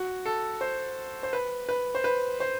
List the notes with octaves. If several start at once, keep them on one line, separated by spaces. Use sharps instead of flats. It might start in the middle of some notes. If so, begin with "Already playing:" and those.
Already playing: F#4
A4
C5
C5
B4
B4
C5
B4
C5